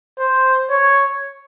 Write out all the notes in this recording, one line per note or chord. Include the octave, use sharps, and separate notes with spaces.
C5
C#5